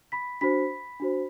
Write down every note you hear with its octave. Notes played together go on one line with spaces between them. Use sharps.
B5 B6
D4 F#4 C5 B5 B6
D4 F#4 C5